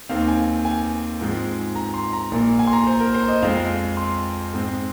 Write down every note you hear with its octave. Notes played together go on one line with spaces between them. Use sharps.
D#2 D#3 C4 F5
G#5
G#5
G#2 F3 G#3 C4
A#5
C6
A#5
A#1 A#2 A#3
G#5
C6
A#5
C5
A#4
C5
D#5
F2 F3 G#3 C4 F5
C6
G#2 G#3 C4